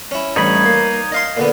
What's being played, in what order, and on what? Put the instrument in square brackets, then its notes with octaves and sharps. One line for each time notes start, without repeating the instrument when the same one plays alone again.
[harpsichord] C#4 E4
[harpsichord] A1 G2 [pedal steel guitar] D#4 C#5 B5
[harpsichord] A#3
D#5 F5 C6
A#2 D3 B3